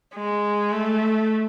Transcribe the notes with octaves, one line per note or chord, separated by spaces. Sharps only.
G#3
A3